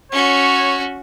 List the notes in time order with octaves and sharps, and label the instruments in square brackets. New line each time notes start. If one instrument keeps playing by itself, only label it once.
[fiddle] C#4 F#4 [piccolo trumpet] C#5